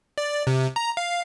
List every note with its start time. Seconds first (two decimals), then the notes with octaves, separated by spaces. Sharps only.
0.18 D5
0.47 C3
0.76 A#5
0.97 F5